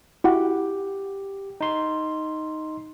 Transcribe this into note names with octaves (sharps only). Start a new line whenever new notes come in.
E4 F#4 G4 F#5
D#4 C6